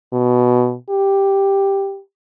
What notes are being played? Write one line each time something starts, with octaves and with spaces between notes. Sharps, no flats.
B2
G4